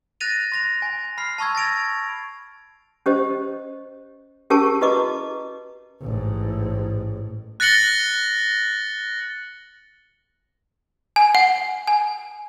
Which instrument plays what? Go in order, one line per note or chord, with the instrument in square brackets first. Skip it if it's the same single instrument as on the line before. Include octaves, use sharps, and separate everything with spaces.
[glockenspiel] F#6 A6 A#6 D#7 F7
C6 A#6 F7
G#5
B5 F6 C7
A5 B5 C#6 E6 G#6
A6 A#6 D7 F7
[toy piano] C#4 G4 C5 D#5
C#4 G4 G#4 A#4 A5 C#6
E4 F#4 B4 D#5 C#6 D6
[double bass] A1 G#2
[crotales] F#6 A6 A#6 C#7 F#7 G7
[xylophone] G#5
F#5
G#5